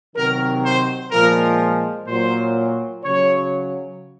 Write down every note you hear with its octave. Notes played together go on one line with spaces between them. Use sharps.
C3 D#3 F#3 A#4
C5
A#2 F3 G#3 A#4
A#2 F#3 C5
C#3 F#3 C#5